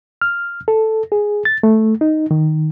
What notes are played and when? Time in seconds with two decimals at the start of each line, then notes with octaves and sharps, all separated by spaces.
0.22 F6
0.68 A4
1.12 G#4
1.45 A6
1.63 A3
2.01 D#4
2.31 D#3